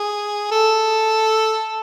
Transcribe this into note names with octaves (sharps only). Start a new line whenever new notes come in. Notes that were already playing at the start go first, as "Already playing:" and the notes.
Already playing: G#4
A4